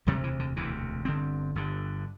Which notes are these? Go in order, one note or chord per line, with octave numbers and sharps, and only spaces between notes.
E1 D2 C3 G3
E3
D3
E1 D2 C3 E3
G1 G2 D3 C4
G1 G2 D3